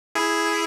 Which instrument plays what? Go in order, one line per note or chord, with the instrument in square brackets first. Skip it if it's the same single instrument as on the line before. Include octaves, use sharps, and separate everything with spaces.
[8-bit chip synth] E4 G#4